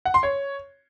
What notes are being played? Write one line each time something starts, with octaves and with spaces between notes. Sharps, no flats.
F#5
C6
C#5